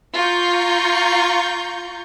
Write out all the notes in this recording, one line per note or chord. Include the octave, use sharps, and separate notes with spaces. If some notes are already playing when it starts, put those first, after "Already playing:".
F4 A#5 C#6 G6